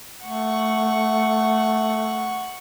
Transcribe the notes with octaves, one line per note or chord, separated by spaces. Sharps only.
A3 F#5 C#6